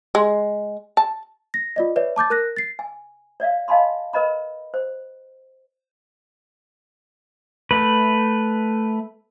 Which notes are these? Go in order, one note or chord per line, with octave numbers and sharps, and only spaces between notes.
G#3
A5
A#6
F4 D5 D#5
B4 C#5 D5 E5
A5 D6 G6 A6
A#4 F#6 A#6
A6 C7
G#5
C#5 D5 E5 F5
D#5 F5 G#5 A5 B5 C6
A#4 B4 D#5 A#5 B5
C5
A3 B4